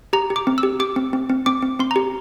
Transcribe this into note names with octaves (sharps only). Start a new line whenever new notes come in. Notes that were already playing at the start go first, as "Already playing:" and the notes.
G4 A#5
G4
D6
C4
E6
G4
G4 D6
C4
C4
C4
C4 D6
C4
C4 C6
G4 A#5